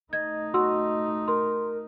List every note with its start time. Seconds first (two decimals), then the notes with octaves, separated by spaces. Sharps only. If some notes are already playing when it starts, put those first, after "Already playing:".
0.13 A3 D#4 D#5 G#6
0.54 F#4 C6 E6
1.28 A#4 C6